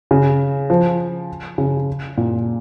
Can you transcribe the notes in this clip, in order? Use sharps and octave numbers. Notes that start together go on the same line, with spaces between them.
C#3
F3
C#3
A#2